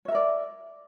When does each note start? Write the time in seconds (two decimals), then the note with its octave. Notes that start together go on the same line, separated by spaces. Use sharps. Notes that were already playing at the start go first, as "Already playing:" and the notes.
0.05 C#5
0.08 E5
0.12 A#4
0.15 D5